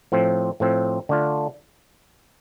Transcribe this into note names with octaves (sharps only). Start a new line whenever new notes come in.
A2 F3 C4
A2 F3 C4
D3 A3 D4 F4